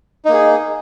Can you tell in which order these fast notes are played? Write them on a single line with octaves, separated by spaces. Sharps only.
D#4 A#3 G#4